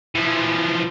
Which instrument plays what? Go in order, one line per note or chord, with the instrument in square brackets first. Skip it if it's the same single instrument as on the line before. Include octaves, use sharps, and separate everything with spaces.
[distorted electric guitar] E3 F3